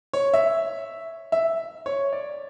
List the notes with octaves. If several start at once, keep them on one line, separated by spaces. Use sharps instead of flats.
C#5
E5
E5
C#5
D5